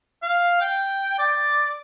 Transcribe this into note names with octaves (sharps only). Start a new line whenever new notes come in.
F5
G5
D5